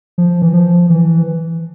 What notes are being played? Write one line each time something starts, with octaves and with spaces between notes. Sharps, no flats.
F3
E3
F3
E3